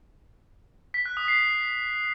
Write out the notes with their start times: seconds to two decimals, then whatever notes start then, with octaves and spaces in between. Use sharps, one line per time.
0.94 B6
1.06 F#6
1.17 D#6
1.28 C7